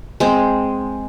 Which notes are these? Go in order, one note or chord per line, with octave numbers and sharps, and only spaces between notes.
G#3 C4